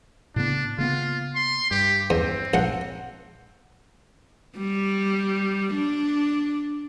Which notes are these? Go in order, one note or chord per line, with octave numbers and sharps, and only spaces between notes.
A2 C#3 B3 D4
C#3 A#3 B3 F4
C6
G2 G4
E2 C4
A#1 F#5
G3
D4